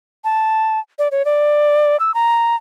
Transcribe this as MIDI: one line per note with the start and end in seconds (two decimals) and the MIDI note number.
0.24 0.79 81
0.99 1.08 74
1.11 1.25 73
1.25 1.97 74
2.00 2.14 88
2.14 2.56 82